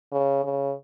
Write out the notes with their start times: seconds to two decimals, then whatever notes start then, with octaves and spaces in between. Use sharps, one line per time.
0.12 C#3
0.44 C#3